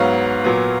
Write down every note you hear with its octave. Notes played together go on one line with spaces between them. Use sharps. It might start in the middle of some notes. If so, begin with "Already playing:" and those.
Already playing: G#2 F#3 B3 C#5 F5
A#2 F#3 B3